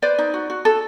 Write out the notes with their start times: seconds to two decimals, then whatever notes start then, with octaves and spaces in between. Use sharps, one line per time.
0.02 B4 C5 D5
0.18 D#4
0.34 F#4
0.50 F#4
0.65 A4